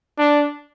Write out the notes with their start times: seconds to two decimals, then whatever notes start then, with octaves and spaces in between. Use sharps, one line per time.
0.19 D4